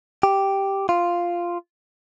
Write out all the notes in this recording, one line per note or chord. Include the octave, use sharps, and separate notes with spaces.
G4
F4